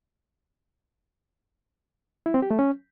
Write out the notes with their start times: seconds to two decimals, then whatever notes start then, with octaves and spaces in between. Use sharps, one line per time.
2.26 E4
2.34 C4
2.42 G4
2.51 A3
2.59 C#4